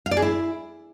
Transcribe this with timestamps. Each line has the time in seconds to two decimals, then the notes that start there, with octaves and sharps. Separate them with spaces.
0.06 F5
0.11 D5
0.17 G#4
0.22 E4